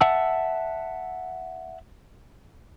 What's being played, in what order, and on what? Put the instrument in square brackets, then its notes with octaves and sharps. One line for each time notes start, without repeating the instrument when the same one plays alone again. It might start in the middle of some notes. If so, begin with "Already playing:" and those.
[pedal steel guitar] E5 F#5 A5 E6